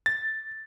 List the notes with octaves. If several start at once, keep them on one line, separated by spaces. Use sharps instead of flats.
A6